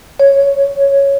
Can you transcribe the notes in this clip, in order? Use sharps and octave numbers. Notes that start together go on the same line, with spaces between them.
C#5